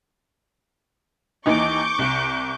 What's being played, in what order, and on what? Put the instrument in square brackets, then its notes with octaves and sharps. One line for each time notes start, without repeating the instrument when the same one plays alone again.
[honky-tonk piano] D#2 E3 D#4 [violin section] C#6 D6 G6
[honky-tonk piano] C2